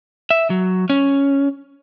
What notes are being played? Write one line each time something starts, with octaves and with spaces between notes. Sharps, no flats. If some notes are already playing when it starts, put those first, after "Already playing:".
E5
F#3
C#4